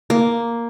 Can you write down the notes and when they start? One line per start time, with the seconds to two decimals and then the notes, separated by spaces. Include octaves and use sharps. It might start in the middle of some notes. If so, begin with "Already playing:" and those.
0.10 A#3